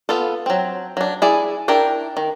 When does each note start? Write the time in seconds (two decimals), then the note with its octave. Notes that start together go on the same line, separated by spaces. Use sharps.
0.09 B3 F4 A4
0.46 F#3 C4
0.97 F#3 D4
1.22 E4 G#4 D5
1.68 D4 E4 A#4 G5
2.17 D#3